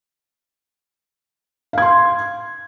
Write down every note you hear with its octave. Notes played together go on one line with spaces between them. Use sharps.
F5 C6 G#6